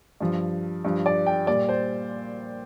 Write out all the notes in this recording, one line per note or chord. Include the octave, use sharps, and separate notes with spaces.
G2 F3
G2 F3
D5
G5
A#2 G3 D5
C5